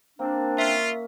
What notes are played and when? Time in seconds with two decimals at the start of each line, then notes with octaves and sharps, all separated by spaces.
0.19 A#3 C4 D4
0.58 C#4 F4 E5